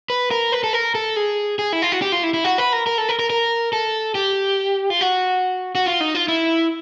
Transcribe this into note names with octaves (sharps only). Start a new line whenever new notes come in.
B4
A#4
B4
A4
A#4
A4
G#4
G#4
E4
F4
F#4
G4
F4
E4
E4
F#4
B4
A#4
A#4
A4
A#4
A#4
A#4
A4
G4
F4
F#4
F#4
F4
D#4
F4
E4